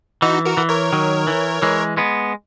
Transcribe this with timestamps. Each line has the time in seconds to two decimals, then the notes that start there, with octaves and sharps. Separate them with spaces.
0.22 E3 D#4 F#4
0.45 F#4 A#4
0.57 E3
0.69 A#4 C#5
0.93 D#3 F#3
1.27 E3
1.62 E3 G#3
1.97 G#3 B3